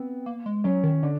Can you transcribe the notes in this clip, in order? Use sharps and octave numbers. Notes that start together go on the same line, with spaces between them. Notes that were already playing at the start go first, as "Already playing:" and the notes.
Already playing: B3 C4
A#3
G#3
F#3 C#4
D#3
D3 D4